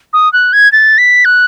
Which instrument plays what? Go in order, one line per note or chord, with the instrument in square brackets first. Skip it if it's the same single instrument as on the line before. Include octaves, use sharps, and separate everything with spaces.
[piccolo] D#6
F#6
G#6
A6
B6
F#6